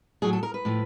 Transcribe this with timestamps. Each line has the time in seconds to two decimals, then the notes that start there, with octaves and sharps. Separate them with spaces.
0.22 A2 F#3 G#4
0.33 A4
0.43 A#4
0.54 B4
0.65 A2 F3